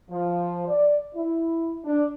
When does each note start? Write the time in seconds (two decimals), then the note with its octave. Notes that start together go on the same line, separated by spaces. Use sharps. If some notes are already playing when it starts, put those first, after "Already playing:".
0.10 F3
0.67 D5
1.15 E4
1.84 D4